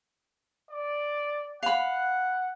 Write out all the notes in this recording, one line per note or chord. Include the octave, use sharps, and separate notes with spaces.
D5
F5 F#5 B5